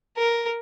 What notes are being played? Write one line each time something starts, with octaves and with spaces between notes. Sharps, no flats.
A#4